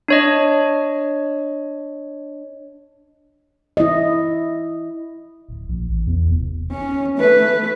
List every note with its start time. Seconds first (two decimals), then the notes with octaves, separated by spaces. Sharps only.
0.08 D4 C#5 D#5
3.77 E4 D#5
5.49 D1
5.69 A#1
5.89 A1
6.07 E2
6.30 F1
6.71 C#4
7.19 A3 B4